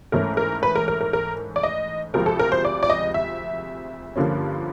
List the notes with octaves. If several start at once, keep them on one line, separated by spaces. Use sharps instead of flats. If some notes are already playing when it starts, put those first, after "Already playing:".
G#2 E3 A3 C#4 A#4
A#4
B4
A#4
A#4
A#4
A#4
D5
D#5
D2 C3 F3 G#3 C4 A#4
A4
A#4
C5
D5
D5
D#5
E5
G2 D3 F3 A#3 C#4